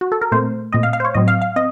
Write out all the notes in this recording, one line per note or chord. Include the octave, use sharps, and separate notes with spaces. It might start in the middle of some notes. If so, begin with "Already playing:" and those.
F#4
A4
A#4
A#2 A3 C4 C5
A#2 A3 C4 D#5
F5
F5
C5
C#5
A2 F#3 C4 D#5
F5
F5
C4 D#5